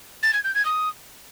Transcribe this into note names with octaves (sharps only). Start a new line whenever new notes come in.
A6
G#6
G6
G#6
D#6